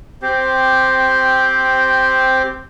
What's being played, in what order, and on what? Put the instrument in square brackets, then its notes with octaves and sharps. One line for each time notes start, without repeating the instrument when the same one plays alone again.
[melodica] C4 G4 C5